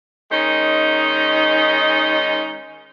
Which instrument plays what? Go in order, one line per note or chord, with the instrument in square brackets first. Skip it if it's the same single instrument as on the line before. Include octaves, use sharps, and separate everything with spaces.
[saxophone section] D#3 G#3 C#4 D#4